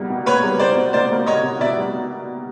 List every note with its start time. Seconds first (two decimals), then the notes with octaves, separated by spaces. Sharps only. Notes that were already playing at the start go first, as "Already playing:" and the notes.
Already playing: B2 G3 A#3
0.10 B2
0.26 A#3 B4 C#5
0.43 G3
0.59 G3 C5 D5
0.76 B2
0.93 A#3 C5 D5
1.11 A#3
1.26 B2 C#5 D#5
1.43 B2
1.60 B2 D5 E5
1.78 G3